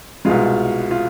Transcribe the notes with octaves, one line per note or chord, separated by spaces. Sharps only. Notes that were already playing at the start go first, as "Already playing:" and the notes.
C2 B2 G#3 F4
F4